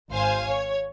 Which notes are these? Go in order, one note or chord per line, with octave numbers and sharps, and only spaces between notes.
G#1 C5 F5 G#5
C#5